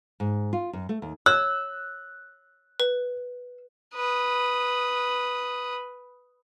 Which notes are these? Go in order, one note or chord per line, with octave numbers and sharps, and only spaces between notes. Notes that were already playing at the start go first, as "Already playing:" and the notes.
G#2
F4
F#2
A3
D#2
C#5 E6 F#6
B4
B4 D#6